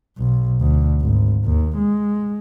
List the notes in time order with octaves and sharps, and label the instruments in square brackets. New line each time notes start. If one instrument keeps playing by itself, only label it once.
[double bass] B1
D2
G#1
D#2
G#3